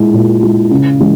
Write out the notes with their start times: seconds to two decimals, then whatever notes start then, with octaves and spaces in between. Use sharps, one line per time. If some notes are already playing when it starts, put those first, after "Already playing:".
Already playing: A#2 G#3 E4
0.14 A#2
0.43 G#3 E4
0.71 C#3
1.00 E3 G#3